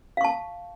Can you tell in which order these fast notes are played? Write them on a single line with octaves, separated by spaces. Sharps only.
F5 C#6 A5